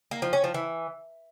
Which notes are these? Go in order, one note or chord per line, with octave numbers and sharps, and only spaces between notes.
A#3
F3
C#4
F3
E3